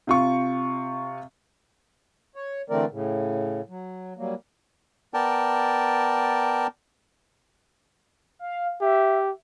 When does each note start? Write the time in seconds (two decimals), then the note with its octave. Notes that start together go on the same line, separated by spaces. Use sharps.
0.07 C3 F4 C#6
2.36 C#5
2.70 D3 E3 A3 C4 A#4 D5
2.91 A2 C#3
3.69 F#3
4.17 F#3 G3 A#3
5.14 B3 A#4 D5 G5 A5
8.39 F5
8.81 G4 E5